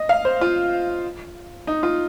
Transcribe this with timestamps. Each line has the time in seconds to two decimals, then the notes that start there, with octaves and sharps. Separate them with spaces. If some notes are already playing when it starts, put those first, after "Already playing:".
Already playing: D#5
0.09 F5
0.25 C5
0.41 F4
1.67 D#4
1.83 F4